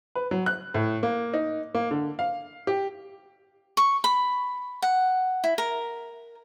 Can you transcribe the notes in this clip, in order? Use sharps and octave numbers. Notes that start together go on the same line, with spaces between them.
B4
F#3
F#6
A2
A#3
D#4
A#3
D3
F5
G4
C#6
B5
F#5
E4
A#4